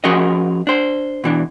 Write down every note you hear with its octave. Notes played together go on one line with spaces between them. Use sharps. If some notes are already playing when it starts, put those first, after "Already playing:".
F3 C#4 F#4 G#4 A#4 D#5
D4 C5
B2 E3 D4